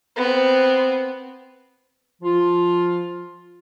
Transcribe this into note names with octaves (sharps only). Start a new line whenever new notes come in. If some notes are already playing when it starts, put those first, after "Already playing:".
B3 C4
F3 F4